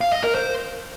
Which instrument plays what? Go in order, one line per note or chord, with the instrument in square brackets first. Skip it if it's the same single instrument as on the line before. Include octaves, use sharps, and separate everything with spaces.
[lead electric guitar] F5
D#5
A#4
C5